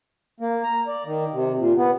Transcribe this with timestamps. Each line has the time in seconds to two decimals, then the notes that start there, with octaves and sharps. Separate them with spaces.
0.40 A#3
0.63 A#5
0.87 D5
1.05 D#3
1.33 C3
1.58 A#2
1.77 B3